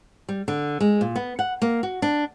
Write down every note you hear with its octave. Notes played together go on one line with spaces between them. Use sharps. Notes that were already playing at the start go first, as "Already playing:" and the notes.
G3
D3
G#3
A#2
B3
F#5
A#3
F#4
D4